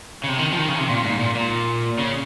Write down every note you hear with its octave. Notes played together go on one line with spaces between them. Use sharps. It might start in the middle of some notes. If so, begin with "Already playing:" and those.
C#3
C3
D#3
F3
D#3
C#3
C3
A#2
G#2
A#2
A#2
C#3